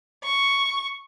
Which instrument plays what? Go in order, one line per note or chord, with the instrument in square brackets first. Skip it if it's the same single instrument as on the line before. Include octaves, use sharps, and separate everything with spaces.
[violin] C#6